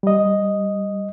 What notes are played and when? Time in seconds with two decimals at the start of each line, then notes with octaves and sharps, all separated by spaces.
0.03 G3 D#5